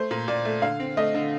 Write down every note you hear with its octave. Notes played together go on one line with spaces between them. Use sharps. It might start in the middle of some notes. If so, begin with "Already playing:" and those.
Already playing: A3 C5
A#2
A#2 D5
A3
D3 F5
C4
A3 D#5
D3